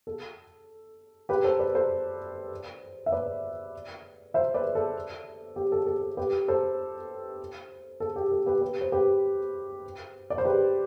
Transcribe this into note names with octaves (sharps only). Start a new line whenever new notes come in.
A4
G4 B4
A4 C5
B4 D5
A4 C5
E5
B4 D5
C5 E5
B4 D5
A4
G4
A4
A4
A4
G4 B4
A4 C5
A4
G4
A4
G4 B4
G4 B4
C5
G4 B4
D5
C5
G4 B4